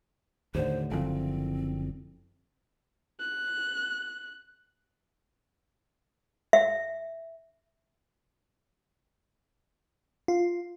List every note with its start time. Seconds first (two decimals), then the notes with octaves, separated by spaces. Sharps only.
0.55 D#2 A2 D3 C5
0.91 F#1 D3 F3 C4
3.20 F#6
6.53 E5
10.28 F4